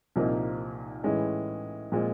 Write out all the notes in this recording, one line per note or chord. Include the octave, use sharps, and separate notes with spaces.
C2 A#2 F3 A#3 D#4
A2 E3 G#3 C#4
A#2 F3 G#3 C4 F4